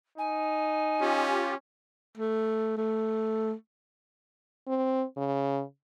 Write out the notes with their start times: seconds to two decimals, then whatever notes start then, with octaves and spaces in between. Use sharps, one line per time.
0.18 D#4 G#5
1.01 C#4 F4 G4
2.18 A3
2.78 A3
4.67 C4
5.17 C#3